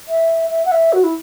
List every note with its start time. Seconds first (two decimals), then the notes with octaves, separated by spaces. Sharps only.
0.08 E5
0.50 E5
0.65 F#5
0.72 E5
0.93 F#4
1.04 E4